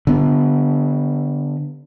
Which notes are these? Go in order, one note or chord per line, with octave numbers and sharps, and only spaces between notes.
D3 B3